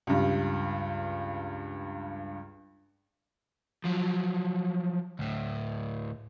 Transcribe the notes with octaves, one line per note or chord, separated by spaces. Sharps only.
C#2 G2
F3 F#3
D2 A2